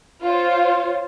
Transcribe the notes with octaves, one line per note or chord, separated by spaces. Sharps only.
F4 C5 C#5